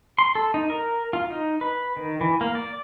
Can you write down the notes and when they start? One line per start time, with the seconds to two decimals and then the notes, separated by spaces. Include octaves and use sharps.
0.19 C6
0.35 A4
0.54 D#4
0.70 A#4
1.13 F4
1.30 D#4
1.61 B4
1.97 D#3
2.21 E3
2.41 A#3
2.55 D5